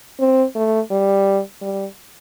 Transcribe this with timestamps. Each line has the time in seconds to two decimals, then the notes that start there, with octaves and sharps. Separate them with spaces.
0.20 C4
0.55 A3
0.91 G3
1.61 G3